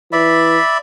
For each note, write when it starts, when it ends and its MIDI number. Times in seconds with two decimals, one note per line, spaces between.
0.12 0.58 52
0.12 0.78 74
0.12 0.78 76
0.12 0.78 83